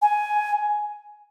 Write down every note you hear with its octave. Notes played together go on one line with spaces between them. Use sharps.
G#5